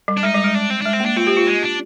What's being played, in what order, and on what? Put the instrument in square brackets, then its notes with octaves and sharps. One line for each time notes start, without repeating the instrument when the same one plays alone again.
[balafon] G3
[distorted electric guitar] D4
[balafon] G#3 [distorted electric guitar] D#4
[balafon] G3
G#3
[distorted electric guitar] D4
C4
[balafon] G#3 [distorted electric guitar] D4
[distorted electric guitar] C4
[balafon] A#3
[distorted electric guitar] D4
[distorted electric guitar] C4 [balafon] F4
[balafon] G4
F4
[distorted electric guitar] G#3
D4